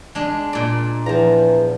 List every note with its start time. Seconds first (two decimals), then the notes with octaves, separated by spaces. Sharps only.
0.15 G#3 D4
0.53 A#2 D5
1.06 E2 F3 A#5